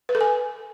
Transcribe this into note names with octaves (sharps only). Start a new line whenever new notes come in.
B4
A4
G#5